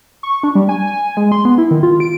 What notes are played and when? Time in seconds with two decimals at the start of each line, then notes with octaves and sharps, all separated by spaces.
0.23 C#6
0.43 D4
0.55 G3
0.69 G#5
0.87 G#5
1.17 G#3
1.32 C6
1.45 B3
1.58 E4
1.71 D#3
1.83 F4
2.00 D7